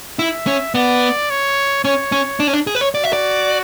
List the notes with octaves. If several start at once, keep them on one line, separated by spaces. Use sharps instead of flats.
E4 E5
C#4
B3 D5
C#5
C#4 C#5
C#4
D4
C#4
D4
G#4
B4
C#5
F#4 D5
E5
D5